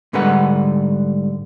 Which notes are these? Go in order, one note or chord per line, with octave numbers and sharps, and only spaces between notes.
G#2 D3 G3 B4 F#5